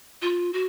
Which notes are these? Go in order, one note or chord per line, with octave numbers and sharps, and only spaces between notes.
F4
F#4